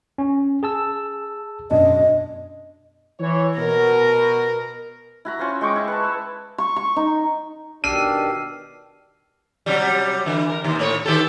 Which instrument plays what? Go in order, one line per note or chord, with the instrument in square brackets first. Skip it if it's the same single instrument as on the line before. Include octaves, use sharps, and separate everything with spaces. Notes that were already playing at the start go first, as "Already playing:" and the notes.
[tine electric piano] C#4
G#4 A5 E6
[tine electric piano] F#2 B2 D4 [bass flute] D#5
[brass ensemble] E3 C#5
[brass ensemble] B2 [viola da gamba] A#4
[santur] E4 F#4 A#5
C#4 F4 C5
G#3 G5 C#6 D6
E4
B4 A5
E6
[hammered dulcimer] C#6
C#6
D#4
[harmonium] B2 D#3 G4 [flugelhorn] D4 [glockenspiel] E6 F6 C7 [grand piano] D#7
[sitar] C3 F#3 G3
D3 E3
A#4
D#2 C3
A2 A3 C#5
D#3 G4 A4